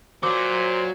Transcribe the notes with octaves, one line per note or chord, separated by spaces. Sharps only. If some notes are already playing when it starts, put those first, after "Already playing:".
A#2 F#3 C5 D6